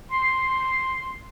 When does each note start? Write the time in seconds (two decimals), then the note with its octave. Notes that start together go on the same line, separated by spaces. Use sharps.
0.10 C6